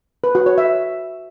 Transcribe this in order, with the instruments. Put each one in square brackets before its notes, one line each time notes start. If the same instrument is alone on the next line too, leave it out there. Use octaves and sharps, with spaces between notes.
[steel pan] B4
F#4
C#5
E5